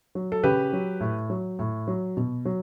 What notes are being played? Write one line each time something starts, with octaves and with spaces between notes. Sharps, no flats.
F#3
A4
C#3 G4 B4
F#3
A2
F#3
A2
F#3
B2
F#3